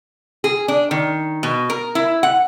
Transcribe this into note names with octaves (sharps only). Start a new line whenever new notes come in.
G#4
D4
D#3
B2
A#4
E4
F#5